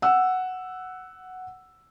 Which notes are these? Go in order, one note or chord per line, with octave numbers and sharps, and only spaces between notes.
F#5 E6